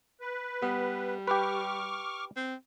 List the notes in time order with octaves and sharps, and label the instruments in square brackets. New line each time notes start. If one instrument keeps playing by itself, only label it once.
[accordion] B4
[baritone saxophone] G3 [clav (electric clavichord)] B3
[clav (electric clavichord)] G4 B4 [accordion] C#6 D6 F6
[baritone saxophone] C4